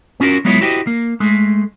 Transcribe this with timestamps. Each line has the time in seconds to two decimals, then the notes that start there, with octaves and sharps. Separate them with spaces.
0.20 B3 C#4 F4 F#4 A#4
0.45 F#3 G#3 B3 E4 F4 C#5
0.61 E4 F#4 G4 C5 C#5 D#5
0.87 A#3
1.20 G#3 A3